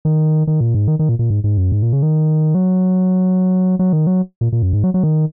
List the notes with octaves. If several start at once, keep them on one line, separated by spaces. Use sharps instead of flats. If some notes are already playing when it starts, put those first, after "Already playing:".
D#3
D#3
A#2
G#2
D#3
D#3
A#2
A#2
G#2
G#2
F#2
G#2
A#2
C#3
D#3
F#3
F#3
D#3
F#3
A#2
A#2
F#2
G#2
F#3
F#3
D#3